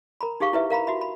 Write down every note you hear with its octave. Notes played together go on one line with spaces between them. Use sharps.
A#4 A#5 B5
D#4 G4 G#4 F5 C#6
E4 B4 E5
A#4 F5 A#5 B5
F#4 E5 B5
B5